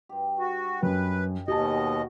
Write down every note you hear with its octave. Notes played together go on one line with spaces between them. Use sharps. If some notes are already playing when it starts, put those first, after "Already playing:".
G2 G4
F#4
F#2 B4
D#2 B2 G4 D#5 G#5 A5
F#4 F5 G5